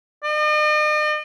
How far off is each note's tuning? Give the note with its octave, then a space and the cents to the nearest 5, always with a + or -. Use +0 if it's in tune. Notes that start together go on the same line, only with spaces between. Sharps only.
D#5 -45